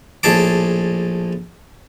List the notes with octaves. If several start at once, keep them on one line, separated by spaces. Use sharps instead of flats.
A#1 A2 G#4 A5 D6